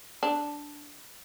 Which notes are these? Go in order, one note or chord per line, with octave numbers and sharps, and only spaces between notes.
D4